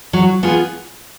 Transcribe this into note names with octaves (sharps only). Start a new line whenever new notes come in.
F#3
B3 F4 G#4